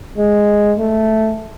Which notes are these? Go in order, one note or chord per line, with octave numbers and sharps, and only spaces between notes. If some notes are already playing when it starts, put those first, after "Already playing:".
G#3
A3